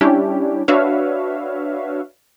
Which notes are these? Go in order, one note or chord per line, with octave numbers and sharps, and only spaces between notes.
G3 C#4 D4 E4 G4
D4 F#4 B4 C#5 E5 F5